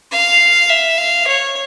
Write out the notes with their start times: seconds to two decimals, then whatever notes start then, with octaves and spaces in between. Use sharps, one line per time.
0.12 F5
0.69 E5
0.98 F5
1.27 C#5